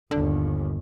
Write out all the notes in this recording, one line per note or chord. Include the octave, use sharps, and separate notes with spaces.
G1 D#2 D3